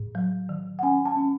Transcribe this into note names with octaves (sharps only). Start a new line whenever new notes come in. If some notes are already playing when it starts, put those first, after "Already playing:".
Already playing: A2
F#3
D#3
F#5
C#4 G#5
A5
C#4